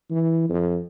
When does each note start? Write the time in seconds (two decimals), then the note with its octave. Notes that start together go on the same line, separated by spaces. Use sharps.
0.10 E3
0.49 F2